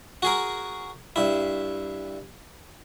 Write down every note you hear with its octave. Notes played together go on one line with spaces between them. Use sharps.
F#4 G#4 A#4
G2 E4